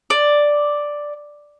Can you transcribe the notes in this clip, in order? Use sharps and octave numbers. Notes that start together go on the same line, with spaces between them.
D5